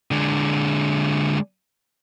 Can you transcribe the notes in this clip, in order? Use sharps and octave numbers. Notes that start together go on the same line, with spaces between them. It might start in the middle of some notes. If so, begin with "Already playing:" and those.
D3 G#3